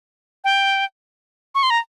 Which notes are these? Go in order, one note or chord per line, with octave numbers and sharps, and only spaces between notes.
G5
C#6
C6
A#5